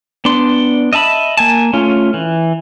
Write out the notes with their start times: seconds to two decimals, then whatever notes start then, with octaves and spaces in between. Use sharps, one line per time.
0.25 B3 D4 D5 C6
0.93 D#5 E5 A5 B5
1.37 A#3 G#5 A5
1.73 A3 C#4 F4
2.14 E3